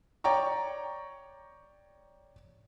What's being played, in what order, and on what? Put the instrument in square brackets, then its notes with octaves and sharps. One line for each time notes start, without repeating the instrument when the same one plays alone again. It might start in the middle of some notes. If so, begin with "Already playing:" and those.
[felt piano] C#5 D5 G5 A#5 C#6